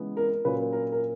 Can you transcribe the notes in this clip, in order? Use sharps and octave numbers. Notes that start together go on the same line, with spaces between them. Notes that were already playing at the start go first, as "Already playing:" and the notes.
Already playing: C#3 E3 G#3 B3
A#4
A#2 F#3 A#3 C#4 B4
A#4
A#4